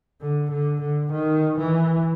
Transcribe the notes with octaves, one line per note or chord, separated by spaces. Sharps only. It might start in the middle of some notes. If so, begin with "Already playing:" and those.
D3
D3
D3
D#3
E3